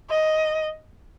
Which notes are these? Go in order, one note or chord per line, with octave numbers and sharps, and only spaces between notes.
D#5